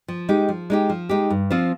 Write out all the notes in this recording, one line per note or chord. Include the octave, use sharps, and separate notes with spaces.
F3
G#3 D#4 G4
F3
G#3 D#4 G4
F3
G#3 D#4 G4
G2
F3 C4 F4 C5